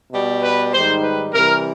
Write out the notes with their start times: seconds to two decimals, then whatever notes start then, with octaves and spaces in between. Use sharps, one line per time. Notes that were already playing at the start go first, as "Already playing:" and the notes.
0.12 B2 G3
0.42 B4
0.73 G#2 D#3 G3 C5
1.03 B4
1.33 C3 E3 G3 A#4